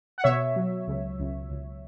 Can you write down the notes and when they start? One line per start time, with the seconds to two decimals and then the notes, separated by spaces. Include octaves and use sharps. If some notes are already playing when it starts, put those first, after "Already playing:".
0.18 F#5
0.24 B2 C#5 E5
0.56 F#3
0.88 C#2
1.19 C#2
1.50 C#2